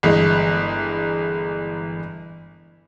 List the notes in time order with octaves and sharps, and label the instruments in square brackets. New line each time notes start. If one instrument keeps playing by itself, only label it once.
[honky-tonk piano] G1 E3 G#3 D#5